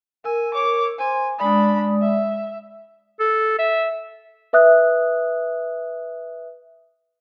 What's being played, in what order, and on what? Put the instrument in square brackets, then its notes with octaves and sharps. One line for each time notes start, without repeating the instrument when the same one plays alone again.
[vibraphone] A#4 E6 [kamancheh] G#5
[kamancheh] C#5 D6
[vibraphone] C5 C6 [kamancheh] G#5
[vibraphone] G#3 D5 D#6 [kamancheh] D4 B5
[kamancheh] E5
[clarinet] A4
E5
[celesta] B4 E5 D#6 F#6